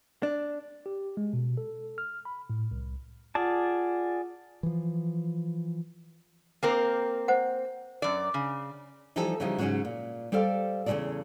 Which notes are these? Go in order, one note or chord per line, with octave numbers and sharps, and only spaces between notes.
D4
G4
G#3
B2
A4
F6
B5
A2
C2
F4 G#4 D5 F#5 A5
E3 F3
A#3 C4 A#4
C5 F#5
F#2 D5
C#3
E3 F3 G3 D#4 G4 A4
C#3 E3 F3 G3 D#4
G#2 C#3 F#3 G#3 C#4 F#4
A#2
G3 A4 C5 D5 F5
E2 C#3 E3 F3 A4 D5